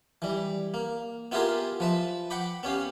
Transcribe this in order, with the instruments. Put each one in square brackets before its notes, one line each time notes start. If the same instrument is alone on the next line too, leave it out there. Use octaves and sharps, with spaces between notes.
[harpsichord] E3 G3
A#3
B3 E4 F4 G4 G#4 A#4
F3 B4 E5
F#5 G5 B5 D6
B3 C#4 G4 F5